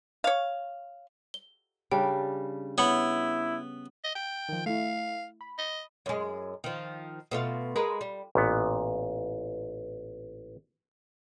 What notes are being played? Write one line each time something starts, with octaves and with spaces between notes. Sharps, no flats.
C#5 F5
G7
C#3 G3 D4 G5
B3 E4 C#5 F#5 B5
D#5
G5
D#3 F3
A3 E4 F5
B5
D#5
F#2 G#3
D#3 F3
B2 A3 F4
G#3 A#4 B4
G3
A1 A#2 B3